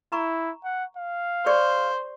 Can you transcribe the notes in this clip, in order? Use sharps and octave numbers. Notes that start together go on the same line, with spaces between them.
E4 A#5 C#6
F#5
F5
G#4 C5 D5 C#6